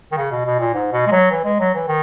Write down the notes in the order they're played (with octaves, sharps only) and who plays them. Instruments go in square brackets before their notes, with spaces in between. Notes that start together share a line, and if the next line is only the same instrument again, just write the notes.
[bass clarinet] D#3
C#3
B2
B2
A#2
G#2
B2
G#3
F#3
E3
G#3
F#3
E3
D#3